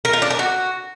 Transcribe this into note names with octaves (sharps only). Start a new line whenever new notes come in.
A#4
F4
D4
A#4
F#4